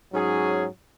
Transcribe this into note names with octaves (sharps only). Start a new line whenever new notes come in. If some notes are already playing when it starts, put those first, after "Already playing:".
G#2 F#3 C#4 G#4